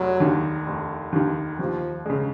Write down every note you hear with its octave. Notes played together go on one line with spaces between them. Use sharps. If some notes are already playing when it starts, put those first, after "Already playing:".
Already playing: F1 F#3
D#2 D#3
F1
D#2 D#3
D#2 F3
C#3 G#3